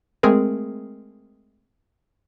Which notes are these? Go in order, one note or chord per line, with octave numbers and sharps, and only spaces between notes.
G#3 A3 C4 G#4 A#4